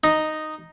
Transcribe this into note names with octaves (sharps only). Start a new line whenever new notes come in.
D#4